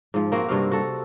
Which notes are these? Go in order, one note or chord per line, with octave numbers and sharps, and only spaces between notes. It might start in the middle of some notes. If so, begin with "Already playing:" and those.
G#2 F3
A#3 C4 F#4
G2 C3 F#4 F5
F#4 A4